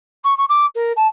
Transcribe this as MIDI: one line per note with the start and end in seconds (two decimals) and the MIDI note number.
0.24 0.36 85
0.37 0.45 85
0.49 0.66 86
0.75 0.92 70
0.96 1.07 81